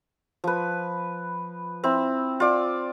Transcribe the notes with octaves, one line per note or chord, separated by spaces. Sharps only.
F3 B4
C4 E4
F4 D5